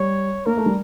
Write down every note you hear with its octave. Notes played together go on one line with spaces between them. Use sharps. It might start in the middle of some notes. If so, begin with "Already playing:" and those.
Already playing: G3 C#5
A#3 A#4
A3
G3